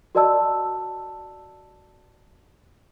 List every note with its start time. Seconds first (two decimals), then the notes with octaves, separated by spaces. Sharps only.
0.15 F#4 A#4 D5 D#5 A5 E6